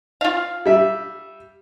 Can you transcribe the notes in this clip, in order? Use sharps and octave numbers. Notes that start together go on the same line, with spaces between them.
F4 F5
G3 E5